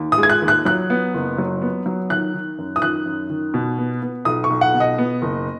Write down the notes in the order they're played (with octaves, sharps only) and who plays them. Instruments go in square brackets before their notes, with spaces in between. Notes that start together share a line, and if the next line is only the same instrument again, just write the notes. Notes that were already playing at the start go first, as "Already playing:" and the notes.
Already playing: [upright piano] D#2
D#6
G#3
G#6
F#6
D#2
F#6
F#3 F#6
B3
F#1
F#3
B3
F#3
D#3 F#6
D#3
F#2
D#6
D#3 F#6
F#2
D#3
B2
B3
B3
B1 D#6
C#6
B1
F#5
B2
D#5
B3
F#1